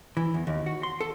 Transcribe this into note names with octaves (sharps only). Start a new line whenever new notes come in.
E3
E2
D#2
F#4
C6
A4